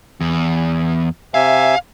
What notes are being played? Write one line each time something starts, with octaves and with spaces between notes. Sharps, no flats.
E2
C3 E5 F5 G#5